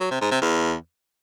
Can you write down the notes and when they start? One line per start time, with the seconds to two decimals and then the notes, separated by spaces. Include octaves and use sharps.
0.01 F#3
0.11 C3
0.21 G#2
0.31 C3
0.41 E2